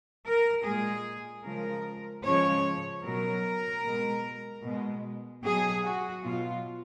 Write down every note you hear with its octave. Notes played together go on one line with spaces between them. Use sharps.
A#4
A#2 G#3 G#4
C#3 F3 G#3 A#4
C#3 F3 G#3 C#5
B2 F#3 A#4
B2 G#3
B2 G#3
B2 F#3 G#4
F#4
B2 F#3 F4